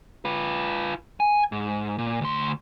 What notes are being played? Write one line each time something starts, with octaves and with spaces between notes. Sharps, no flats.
F4 B4
G#5
G#2
A#2
D2 C6